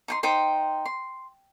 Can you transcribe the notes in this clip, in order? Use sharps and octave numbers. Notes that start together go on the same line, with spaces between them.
D#4 G5 C6
D#4 C5 G5 C6
C6